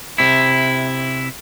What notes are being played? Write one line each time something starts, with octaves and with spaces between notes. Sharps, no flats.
C3 E4